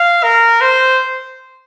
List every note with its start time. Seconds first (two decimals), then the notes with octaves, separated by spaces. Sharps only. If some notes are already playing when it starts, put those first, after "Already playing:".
Already playing: F5
0.23 A#4
0.61 C5